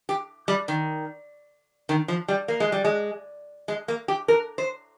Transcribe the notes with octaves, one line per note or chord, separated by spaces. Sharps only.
G4
G3
D#3
D#3
F3
G3
A#3
G#3
G3
G#3
G#3
A#3
G4
A#4
C5